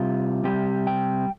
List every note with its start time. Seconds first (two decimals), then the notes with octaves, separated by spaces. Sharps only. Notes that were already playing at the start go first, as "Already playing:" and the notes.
Already playing: C3 G3 F4
0.44 C3 G3 G4
0.87 G5